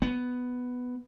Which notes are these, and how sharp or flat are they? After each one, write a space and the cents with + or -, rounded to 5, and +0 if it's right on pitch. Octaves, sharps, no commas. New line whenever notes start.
B3 +5